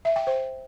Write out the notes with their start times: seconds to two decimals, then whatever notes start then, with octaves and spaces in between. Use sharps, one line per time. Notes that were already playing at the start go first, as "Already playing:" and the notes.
0.05 E5
0.16 G5
0.27 C5